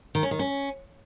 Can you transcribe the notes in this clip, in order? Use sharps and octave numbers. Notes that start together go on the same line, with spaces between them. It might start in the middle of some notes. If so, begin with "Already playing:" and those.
D#3
C#4
D#3
C#4